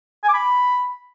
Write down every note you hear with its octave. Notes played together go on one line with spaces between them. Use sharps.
G#5
D6
B5